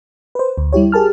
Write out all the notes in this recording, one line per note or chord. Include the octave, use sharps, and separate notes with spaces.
B4 C5
D2
G3 E4 G4 C#5
G4 G#4 A#4 A5 F6